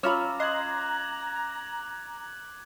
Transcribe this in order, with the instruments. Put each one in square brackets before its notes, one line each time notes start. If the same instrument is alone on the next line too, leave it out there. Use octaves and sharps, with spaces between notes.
[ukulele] C#4 F4 B5 [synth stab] C#5 E6 F6 [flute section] A#5 [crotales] D6
[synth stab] D#5 C6 [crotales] F#6 G#6 F#7